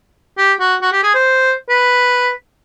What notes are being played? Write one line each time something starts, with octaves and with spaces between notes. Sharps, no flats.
G4
F#4
F#4
G4
G#4
C5
B4